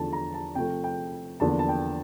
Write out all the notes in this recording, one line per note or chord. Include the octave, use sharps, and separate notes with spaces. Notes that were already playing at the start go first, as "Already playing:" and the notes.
Already playing: E2 D3 F3 A3 A5
A#5
A5
C3 F3 A3 G5
G5
E2 D3 F3 A#3 A5
A5
G5